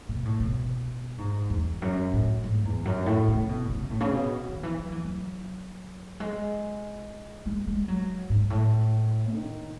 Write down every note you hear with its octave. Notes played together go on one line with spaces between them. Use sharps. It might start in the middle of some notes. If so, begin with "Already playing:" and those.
B2
A2
B2
G#2
E2
F#2
A2
G#2
E2
F#2
A2
C#3
B2
C#3
A2
C#3
B2
D#3
E3
F#3
E3
F#3
G#3
G#3
G#3
F#3
G#2
A2
D#3